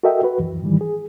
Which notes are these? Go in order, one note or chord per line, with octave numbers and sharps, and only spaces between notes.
F#4 A4 A#4 D#5 E5 G5
F#4 B4
C#2 F#2 E3
G#2 D#3 E3 G3
G#4